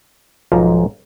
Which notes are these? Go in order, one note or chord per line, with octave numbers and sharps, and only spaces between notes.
B1 G#2 F3 A#5